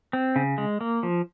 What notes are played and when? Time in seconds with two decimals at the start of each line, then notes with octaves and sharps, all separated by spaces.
0.13 C4
0.36 C#3
0.58 G#3
0.81 A#3
1.03 F3